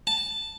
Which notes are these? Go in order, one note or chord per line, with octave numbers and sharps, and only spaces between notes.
A5